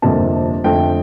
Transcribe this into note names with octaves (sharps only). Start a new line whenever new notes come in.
G1 F2 C3 G3 A#3 A5
F2 D3 A3 G5